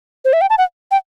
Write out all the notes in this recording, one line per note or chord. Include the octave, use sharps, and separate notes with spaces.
C5
E5
G5
A5
F#5
G5